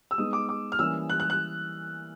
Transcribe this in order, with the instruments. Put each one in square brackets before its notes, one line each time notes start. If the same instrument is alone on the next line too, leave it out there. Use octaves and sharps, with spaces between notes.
[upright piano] E6
[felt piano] G#3 B3 D#4 [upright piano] D#6
[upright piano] D6
D6
F6
[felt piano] E3 G3 A#3 C#4 [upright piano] E6
[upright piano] F#6
F#6
F#6